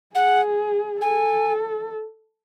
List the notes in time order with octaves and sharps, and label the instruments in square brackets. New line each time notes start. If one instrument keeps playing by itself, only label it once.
[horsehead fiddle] G#4 [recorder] F#5
[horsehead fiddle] A4 [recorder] G#5